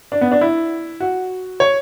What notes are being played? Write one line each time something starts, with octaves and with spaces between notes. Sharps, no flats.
D4
B3
D4
E4
F#4
C#5